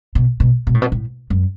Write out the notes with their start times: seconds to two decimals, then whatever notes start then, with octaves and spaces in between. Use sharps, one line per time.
0.15 B2
0.40 B2
0.67 B2
0.74 A2
0.82 B2
0.92 A2
1.30 F#2